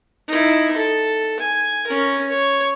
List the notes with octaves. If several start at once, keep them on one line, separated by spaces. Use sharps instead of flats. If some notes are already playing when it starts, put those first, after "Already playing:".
D#4 E4
A4
G#5
C#4 A#4
C#5